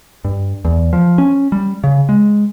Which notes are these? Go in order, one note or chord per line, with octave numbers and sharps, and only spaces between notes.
G2
E2
F3
C#4
G3
C#3
G#3